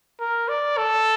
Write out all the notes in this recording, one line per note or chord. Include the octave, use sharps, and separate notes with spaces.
A#4
D5
A4